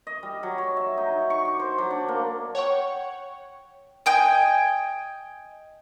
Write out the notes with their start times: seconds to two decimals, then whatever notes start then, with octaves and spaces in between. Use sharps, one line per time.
0.07 D#5
0.23 G3
0.43 F#3
0.58 C#5
0.77 E5
0.97 D#4
1.30 C#6
1.45 D6
1.59 C5
1.78 F#3
1.91 D4
2.08 A#3
2.55 C#5 F#5 G5 C#6
4.06 D#5 G5 G#5